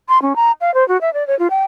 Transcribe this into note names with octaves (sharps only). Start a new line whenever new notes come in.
C6
C#4
A#5
F5
C5
F#4
E5
D5
C#5
F4
G5